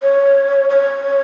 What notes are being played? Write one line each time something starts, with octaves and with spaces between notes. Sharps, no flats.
C#5
C#5